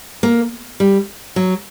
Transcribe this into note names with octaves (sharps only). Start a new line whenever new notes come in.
A#3
G3
F#3